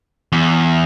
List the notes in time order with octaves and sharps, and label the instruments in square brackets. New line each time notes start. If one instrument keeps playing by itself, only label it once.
[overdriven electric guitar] E2